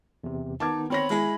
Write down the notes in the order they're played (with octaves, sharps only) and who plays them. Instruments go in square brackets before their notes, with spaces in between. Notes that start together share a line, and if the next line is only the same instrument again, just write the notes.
[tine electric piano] E2 C3
[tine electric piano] D#3 B3 [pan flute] D#4 [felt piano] A5 D6 G#6
[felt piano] C4 C#5 A#6 [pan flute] B5
[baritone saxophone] G#3 [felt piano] E4 G#5